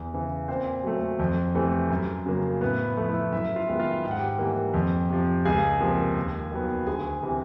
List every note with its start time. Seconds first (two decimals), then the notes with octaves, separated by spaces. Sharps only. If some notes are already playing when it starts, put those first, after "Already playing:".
Already playing: E2
0.14 C#3 E3
0.48 A#2 C4 C5
0.84 F#3 A3
1.19 F2
1.55 C3 E3 A3
1.90 F#2
2.26 C#3 F#3 A#3
2.61 A2 B3 B4
2.97 F3 A3
3.09 E4 E5
3.32 F#2 E4 E5
3.56 F4 F5
3.68 D#3 G#3 B3
3.80 F4 F5
4.03 G#2 G5
4.11 F#5
4.19 G4 G5
4.39 E3 G3 A#3
4.74 F2
5.09 C3 F3
5.45 C#2 G#4 G#5
5.80 C3 F3 A#3
6.16 D#2
6.51 D#3 F#3 B3
6.87 D2 G#4 G#5
7.23 C3 E3